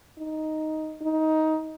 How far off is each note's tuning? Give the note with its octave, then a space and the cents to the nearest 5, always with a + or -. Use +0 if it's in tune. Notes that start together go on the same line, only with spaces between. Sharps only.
D#4 +5
D#4 +15